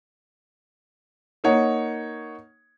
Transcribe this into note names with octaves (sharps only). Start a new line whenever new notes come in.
A#3 D#4 C#5 F#5